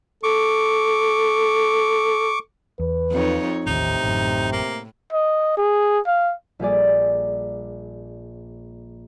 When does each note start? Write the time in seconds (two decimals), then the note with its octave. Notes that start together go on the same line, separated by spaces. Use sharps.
0.23 A4 C#6 D6
2.79 E2 B4
3.12 F2 D#4 C#5
3.67 A1 D#2 A2 C3 D#4
4.04 A1 F#2
4.53 A#3
5.12 D#5
5.57 G#4
6.07 F5
6.60 A#1 G3 G#4 D5